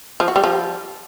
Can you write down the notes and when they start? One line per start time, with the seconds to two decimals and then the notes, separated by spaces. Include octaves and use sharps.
0.20 F3
0.28 F#4
0.36 G3
0.44 F3